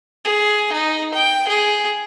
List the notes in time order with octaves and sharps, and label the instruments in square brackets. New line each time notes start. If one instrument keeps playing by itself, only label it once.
[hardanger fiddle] G#4
D#4
G5
G#4